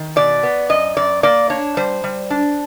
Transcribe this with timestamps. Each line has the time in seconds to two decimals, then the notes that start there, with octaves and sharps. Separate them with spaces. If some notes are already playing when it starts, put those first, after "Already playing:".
Already playing: D#3
0.16 B2 D5
0.43 B3
0.69 F#2 D#5
0.97 F#2 D5
1.23 A#3 D5
1.50 D4 C#5
1.77 G3 C5
2.04 G3
2.30 D4